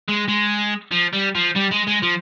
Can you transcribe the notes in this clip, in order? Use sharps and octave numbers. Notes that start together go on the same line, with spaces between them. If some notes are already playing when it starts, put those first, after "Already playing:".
G#3
G#3
F3
G3
F3
G3
G#3
G#3
F3